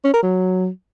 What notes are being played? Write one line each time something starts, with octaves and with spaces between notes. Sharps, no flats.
C#4
A#4
F#3